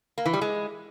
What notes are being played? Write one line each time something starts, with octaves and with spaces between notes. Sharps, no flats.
A#3
E3
G3
G#3